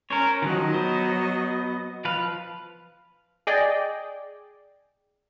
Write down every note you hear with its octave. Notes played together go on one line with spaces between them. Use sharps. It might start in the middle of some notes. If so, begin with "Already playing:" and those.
C#4 A#4 C5 C#5
D#3 F3 F#3 D#5 F#6
B3 C5
F3 B4 F5
G#4 D5 D#5 G5